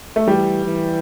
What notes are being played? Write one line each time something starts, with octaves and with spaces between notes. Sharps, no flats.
A3
E3 G3
E3